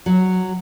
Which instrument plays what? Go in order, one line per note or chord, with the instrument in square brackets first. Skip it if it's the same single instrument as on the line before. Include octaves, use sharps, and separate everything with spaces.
[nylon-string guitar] F#3